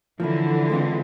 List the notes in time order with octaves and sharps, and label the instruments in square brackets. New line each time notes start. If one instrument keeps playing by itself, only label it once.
[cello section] D3 E3 [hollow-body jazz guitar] F3 A#3 C#4 E4
[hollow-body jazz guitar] G#3 C4 F4